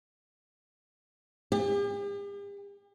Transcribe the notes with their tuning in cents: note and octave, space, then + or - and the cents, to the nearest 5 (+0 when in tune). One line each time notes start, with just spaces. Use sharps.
G4 +45